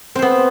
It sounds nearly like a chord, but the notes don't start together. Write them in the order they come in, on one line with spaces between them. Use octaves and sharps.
C4 C5 B3